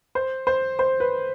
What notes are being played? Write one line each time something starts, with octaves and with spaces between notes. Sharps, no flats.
C5
C5
C5
B4